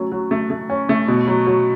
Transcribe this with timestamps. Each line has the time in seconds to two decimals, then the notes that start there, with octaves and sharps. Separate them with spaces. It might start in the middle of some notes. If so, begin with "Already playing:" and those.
Already playing: F#3 A3 C#4
0.12 F#3
0.31 A3
0.50 A3
0.70 C#4
0.89 A3
1.08 B2
1.28 F#3
1.47 F#3